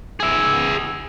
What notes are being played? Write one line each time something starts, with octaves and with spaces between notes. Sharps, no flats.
G#4 E5